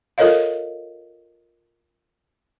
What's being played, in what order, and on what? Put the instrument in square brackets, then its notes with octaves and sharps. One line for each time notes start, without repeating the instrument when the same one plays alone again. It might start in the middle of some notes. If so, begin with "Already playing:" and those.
[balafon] F4 A4 A#4 C#5 D#5 F5